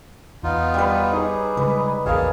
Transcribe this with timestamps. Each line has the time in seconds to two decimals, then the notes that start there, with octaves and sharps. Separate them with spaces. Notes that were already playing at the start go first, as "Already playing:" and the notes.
0.43 E2 B3 D#4 F4
0.74 G3 B4
1.12 D#4 G#4 C#5
1.57 C#3 G3 G#3 B4
2.06 A#1 E2 A#2 A#3 G#4 C#5 F5 A5